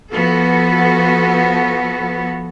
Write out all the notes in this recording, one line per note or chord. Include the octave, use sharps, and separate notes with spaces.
F3 B3 F#4 A4